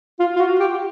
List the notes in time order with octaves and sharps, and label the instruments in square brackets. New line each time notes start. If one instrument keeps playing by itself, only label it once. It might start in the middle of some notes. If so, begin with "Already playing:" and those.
[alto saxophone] F4
F4
F#4
G4